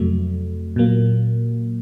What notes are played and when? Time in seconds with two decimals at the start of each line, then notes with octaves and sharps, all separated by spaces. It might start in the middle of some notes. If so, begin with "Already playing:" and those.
Already playing: F2 C3 F#3 A3
0.76 A#2 F#3 A#3